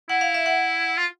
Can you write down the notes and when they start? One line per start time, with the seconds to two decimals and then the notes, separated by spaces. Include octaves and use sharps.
0.09 E4 F#5
0.21 F5
0.34 E5
0.46 F#5
0.97 F4